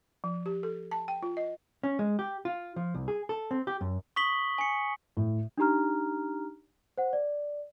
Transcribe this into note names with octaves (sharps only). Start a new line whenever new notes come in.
F3
G4
A4
A5
G5
F4
D#5
C#4
G#3
G4
F4
F3
C2
G#4
A4
C4
G4
F#2
C#6 D#6 B6 F#7 G7
G#5 C#7
A2
D4 D#4 G4 A#5 F6
C5 F#5
D5